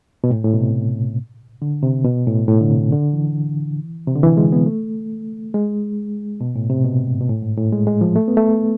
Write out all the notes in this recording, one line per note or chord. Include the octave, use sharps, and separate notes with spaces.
B2
A2
A2
B2
C3
D3
C3
B2
A2
A2
D3
C3
D3
E3
C3
D3
E3
G#3
B3
A3
G#3
B2
A2
C3
B2
G#2
B2
A2
G#2
A2
G#3
G#3
F3
A3
B3
A3